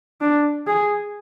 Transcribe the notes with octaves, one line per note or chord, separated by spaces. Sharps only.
D4
G#4